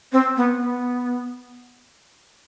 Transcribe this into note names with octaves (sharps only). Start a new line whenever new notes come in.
C4
B3
B3